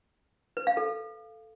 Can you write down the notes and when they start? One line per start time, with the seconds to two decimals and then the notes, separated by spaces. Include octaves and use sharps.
0.57 B4
0.67 F5
0.77 A4